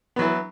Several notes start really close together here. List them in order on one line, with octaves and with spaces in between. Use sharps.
B3 F#3 E3